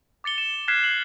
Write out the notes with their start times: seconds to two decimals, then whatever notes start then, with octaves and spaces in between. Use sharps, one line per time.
0.24 D6 A6 C#7 G7
0.38 E7
0.68 F6 F#6 G#6 B6 C7 E7
0.83 C7 F#7